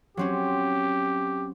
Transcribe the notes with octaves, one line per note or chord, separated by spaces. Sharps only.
F#3 C4 C#4 G4